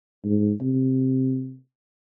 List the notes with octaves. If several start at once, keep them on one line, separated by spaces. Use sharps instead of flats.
G#2
C3